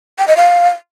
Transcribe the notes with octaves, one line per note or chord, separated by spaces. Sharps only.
G5
D#5
F5